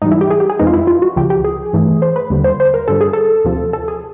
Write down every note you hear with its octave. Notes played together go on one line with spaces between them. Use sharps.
G#2 E3 G3 D#4
E4
G4
G#4
G4
G#4
F2 C3 E3 G#3 D#4
F4
E4
F4
F#4
C#2 C#3 F3 G4
G4
G#4
G2 E3 A3
C5
B4
D#2 D3 G3
C5
C5
A#4
G2 D3 G3 A4
G#4
A4
D2 C3 F3
A4
G#4